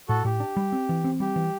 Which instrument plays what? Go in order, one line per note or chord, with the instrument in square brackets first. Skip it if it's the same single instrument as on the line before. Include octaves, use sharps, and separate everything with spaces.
[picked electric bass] A2 [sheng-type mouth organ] F#4 A4
[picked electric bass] A2 [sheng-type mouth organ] G4
[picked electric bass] D4
G3
C4
E3
C4
[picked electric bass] G3 [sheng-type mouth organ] G4
[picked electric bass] E3